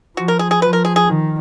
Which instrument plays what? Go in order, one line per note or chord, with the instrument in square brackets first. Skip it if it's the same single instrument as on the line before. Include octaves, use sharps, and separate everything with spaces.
[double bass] F3 [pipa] F#4
[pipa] A#4
G#4
G#4
[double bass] F3 [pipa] B4
[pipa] A#4
G#4
G#4
[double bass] D#3